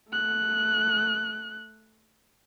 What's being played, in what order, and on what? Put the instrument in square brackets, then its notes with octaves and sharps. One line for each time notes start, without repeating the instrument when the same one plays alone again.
[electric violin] A3 F#6